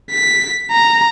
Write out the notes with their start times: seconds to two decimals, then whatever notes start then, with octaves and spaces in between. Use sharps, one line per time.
0.11 B6
0.72 A#5